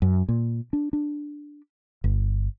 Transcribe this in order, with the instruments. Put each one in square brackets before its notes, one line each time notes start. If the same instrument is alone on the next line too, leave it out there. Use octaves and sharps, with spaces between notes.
[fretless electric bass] F#2
A#2
D4
D4
G1